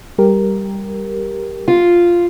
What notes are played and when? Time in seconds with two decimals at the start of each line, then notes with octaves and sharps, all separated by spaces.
0.18 G3 G4 A#4
1.68 F4